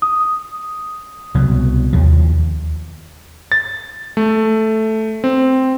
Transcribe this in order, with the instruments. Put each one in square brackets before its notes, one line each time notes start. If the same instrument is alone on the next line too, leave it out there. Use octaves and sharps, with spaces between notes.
[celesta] D#6
[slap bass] C2 B2 F#3
D#2 F3
[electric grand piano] A6
A3
C4